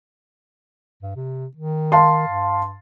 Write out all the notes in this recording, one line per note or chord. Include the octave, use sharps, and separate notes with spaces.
G2
C3
D#3
F5 A5 C6
G2